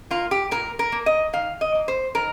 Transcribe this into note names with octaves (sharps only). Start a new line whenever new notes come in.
A#3 F4
G4
A#2 A#4
A#4
A#3
D#5
D#3 F5
D#5
A#3
C5
D#3 A#4